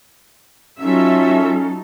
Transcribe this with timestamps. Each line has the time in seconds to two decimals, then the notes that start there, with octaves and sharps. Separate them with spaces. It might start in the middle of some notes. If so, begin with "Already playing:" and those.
0.79 F#3 C#4 D#4 F4 A4 E5